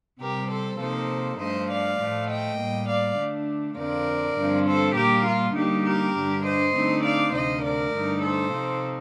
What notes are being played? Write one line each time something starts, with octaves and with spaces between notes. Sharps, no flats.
C3 G3 C4 G4 A#4
A4 C5
C3 F3 A#3 D#4 A4 C5
G2 F3 A3 C5 D#5
D5 F5
A2 F3 A3
D#5 G5
A2 G3 A#3
D5 F5
D3 A3 D4
F2 D3 F3 A#4 D5
G2 D3 F3 C4
A4 C5
A#2 G3 A#3 G4 A#4
F4
D3 G3 A#3 D#4 G4
G4 A#4
G2 D3 G3 D4
C5 D#5
D3 A3 C4 D#4
D5 F5
D2 C3 F3 C5 D#5
A#4 D5
G2 D3 A3 D#4
A4 C5
C3 F3 C4 D#4